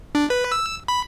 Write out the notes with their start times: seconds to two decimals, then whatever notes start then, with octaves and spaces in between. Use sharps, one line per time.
0.15 D4
0.30 B4
0.52 E6
0.88 B5